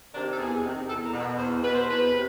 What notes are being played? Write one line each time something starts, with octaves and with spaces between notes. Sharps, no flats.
C3 D#3 D4
A4
E2 G#4
C3 D#3
E2 A4
A#4
B2
B4
E2 C5
B2 B4
C5
E2 B4
C3